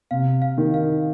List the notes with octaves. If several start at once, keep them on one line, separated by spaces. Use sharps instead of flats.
C3 F5
F5
D#3
F5